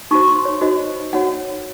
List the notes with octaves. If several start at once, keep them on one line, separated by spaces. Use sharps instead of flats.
D#4 F#4 C5 C#6
C6
C#5
D#4 F#4 C5 D#5
D#4 F#4 C#5 F#5